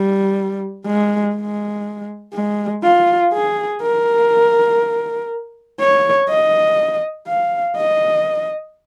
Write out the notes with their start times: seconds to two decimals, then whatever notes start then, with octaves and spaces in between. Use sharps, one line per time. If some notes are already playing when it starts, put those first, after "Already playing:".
Already playing: G3
0.86 G#3
1.35 G#3
2.34 G#3
2.83 F4
3.33 G#4
3.82 A#4
5.80 C#5
6.29 D#5
7.28 F5
7.77 D#5